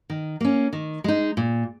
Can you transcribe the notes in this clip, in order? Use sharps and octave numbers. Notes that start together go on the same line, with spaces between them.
D#3
A#3 C#4
D#3
G#3 D#4
A#2